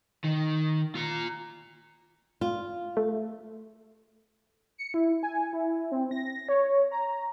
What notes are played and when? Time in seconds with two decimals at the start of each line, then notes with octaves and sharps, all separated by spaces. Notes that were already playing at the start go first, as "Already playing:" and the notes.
0.25 D#3
0.95 F4 A#5
2.41 F4
2.97 A3
4.78 C#7
4.94 E4
5.23 G#5
5.53 E4
5.92 C4
6.11 A#6
6.49 C#5
6.92 A#5